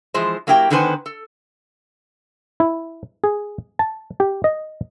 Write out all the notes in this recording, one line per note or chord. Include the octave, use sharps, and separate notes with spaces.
E3 F3 G#3 C5
F#3 A#3 E4 G4 A#4 G5
D3 D#3 B3 B4 C5 G#5
A4
E4
G#4
A5
G4
D#5